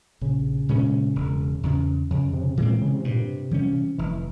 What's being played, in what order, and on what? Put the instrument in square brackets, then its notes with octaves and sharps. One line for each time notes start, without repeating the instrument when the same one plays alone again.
[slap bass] A#1 [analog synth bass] C#3
[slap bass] A#2 G#3 C#4
E1
E2 C#3
[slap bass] F2 [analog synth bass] C#3
[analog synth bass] C3
C#3
C3
[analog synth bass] A#2 [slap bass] E3 G#3 C4
[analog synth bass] C#3
C3
[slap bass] G2 [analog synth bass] A#2
[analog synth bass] C3
[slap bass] E3 G3 C#4
[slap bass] F1 [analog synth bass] E3